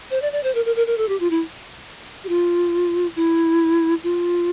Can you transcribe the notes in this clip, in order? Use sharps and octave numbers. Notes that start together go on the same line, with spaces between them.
C5
D5
D5
C5
A#4
A#4
A#4
A#4
A4
G4
F4
E4
G4
F4
E4
F4